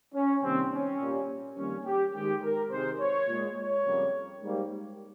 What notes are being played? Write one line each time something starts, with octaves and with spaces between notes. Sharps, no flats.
C#4
C3 D#3 G3 A#3 C4
C#4
A#2 G3 A#3
F2 D#3 G3 A#3 C#4
G4
G#2 D#3 G#3 G4
A#4
C3 D#3 G#3 C5
C#5
A#2 G#3
C#5
F2 C#3 G3 A#3
G#2 G3 A#3